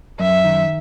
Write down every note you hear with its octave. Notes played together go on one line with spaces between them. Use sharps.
F#2 E5
D#3